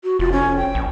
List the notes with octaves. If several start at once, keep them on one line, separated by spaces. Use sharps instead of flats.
F#4
F1 F4
C#4
G5
A#1